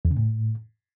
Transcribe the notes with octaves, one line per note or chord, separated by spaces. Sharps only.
E2
C#3
A2